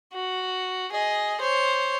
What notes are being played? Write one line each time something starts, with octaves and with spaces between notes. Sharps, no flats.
F#4
G#4 D#5
C5 C#5